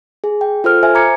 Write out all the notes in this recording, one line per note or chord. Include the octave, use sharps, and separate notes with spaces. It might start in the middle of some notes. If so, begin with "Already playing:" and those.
G#4
G5
F4 A4 C5 F6
C5 E5 G#5
A#5 D6 G#6 C#7